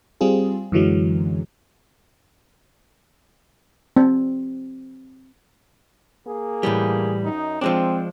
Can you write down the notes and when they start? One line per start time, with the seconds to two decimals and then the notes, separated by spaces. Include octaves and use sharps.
0.21 G3 C4 F4 G#4
0.72 F#2 D3 E3 F#3 G#3
3.97 C4
6.26 A#3 G#4
6.63 A2 E3 G3
7.24 F#2 D#4
7.61 F3 G#3 C4 D4